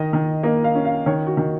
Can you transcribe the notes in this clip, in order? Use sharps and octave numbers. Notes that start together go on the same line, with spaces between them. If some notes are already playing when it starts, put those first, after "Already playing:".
Already playing: D#3 D#5
D#3
A#3 D#5
F5
C#4
F5
D#3 C#5
F#4
D#3